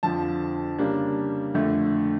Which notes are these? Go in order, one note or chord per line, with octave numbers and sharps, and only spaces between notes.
F2 D3 F3 A5
C#3 G3 A#3 D4
F2 D3 A3